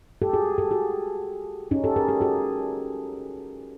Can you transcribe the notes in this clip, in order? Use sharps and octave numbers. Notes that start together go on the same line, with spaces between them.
G4 A4
F#4 G#4
G4 A4
F#4 G#4
C#4 D#4
G4 A4
G#4 A#4
G4 A4
F#4 G#4